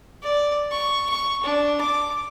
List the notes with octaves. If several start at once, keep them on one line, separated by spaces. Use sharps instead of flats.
D5
C#6
C#6
D4
D6